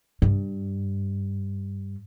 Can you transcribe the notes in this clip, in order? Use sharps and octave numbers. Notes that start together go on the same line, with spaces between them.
G2